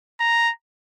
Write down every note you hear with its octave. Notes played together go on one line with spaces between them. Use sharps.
A#5